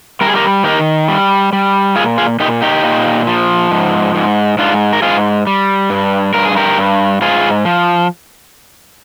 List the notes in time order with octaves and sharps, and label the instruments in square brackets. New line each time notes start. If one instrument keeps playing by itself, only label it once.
[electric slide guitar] G3 A#4
G#4
G4 A#4
D#3 G4 A#4
G3
G3
A#2 F4 G#4
F4 G#4
A#2 D#4 G4
D#4 G4
A#2
F3
G#2
G#2
G#2 D4 F4
A#4
G#2 F4 G#4
G3
G2
G2 A#4
G#4
G4 A#4
G2
G#2 F4 G#4
F3